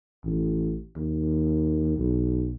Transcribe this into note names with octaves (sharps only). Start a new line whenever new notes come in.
A1
D#2
B1